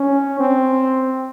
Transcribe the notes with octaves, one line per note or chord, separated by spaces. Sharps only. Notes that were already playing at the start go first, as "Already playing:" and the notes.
Already playing: C#4
C4